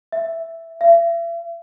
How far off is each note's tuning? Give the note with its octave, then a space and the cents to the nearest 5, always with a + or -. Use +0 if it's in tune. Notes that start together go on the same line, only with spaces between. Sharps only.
E5 +5
E5 +40